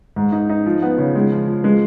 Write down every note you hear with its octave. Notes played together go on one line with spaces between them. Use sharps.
G#2
D#4
D#4
F3
B3
C#3
G#3
F3
F3
G#3